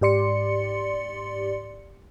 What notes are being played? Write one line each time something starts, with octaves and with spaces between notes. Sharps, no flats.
G#2 G4 D5 C6 C#7